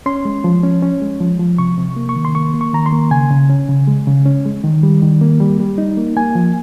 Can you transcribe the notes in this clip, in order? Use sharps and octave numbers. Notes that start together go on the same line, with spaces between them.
C#4 C6
G#3
F3
C#4
C#4
G#3
F3
F3
C3 C#6
C3
A#3
C#6
D#3
C6
A#3 C#6
A#3
C#6
D#3 A#5
C6
A#3
C#3 G#5
C#3
C#4
C#3
G#3
C#3
C#4
G#3
D#3
G3
D#3
A#3
G3
G3
D#4
A#3
A#3 G#5
F3